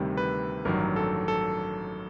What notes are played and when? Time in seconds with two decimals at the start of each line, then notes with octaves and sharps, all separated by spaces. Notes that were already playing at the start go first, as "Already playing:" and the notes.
Already playing: D2 C3 D#3 G3 C5
0.17 B4
0.65 A1 G2 D#3 F#3 A#4
0.96 A4
1.28 A4